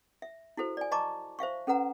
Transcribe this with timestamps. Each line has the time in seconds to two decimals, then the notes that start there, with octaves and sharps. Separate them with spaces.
0.22 E5
0.57 E4 F#4 A4 C5
0.77 D5 G#5
0.91 D#5 A5 A#5 C#6 D6
1.39 C5 E5 F5 C#6
1.67 C#4 A4 B4 F#5 A#5